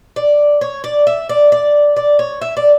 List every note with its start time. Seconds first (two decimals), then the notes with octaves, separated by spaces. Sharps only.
0.16 D5
0.61 C#5
0.84 D5
1.07 E5
1.29 D5
1.52 D5
1.96 D5
2.19 C#5
2.42 E5
2.57 D5